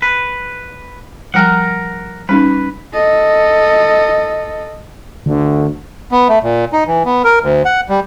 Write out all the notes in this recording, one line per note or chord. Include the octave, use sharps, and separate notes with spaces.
B4
F3 G3 A#4 F#5 G5
G3 C#4 D#4 B4
A4 D#5
D2 D3
B3
A3
A#2
D#4
E3
B3
A#4
D2
F#5
G3